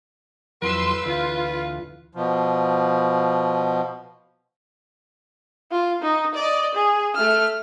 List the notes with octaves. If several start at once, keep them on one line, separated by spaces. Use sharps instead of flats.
F2 E3 F#3 B4 C6 E6
D2 E3 F4
B2 F3
F4
D#4
D5 D#5
G#4
A3 F6